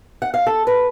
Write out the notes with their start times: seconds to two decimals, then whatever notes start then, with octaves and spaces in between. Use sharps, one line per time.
0.22 F#5
0.34 F5
0.47 A4
0.67 B4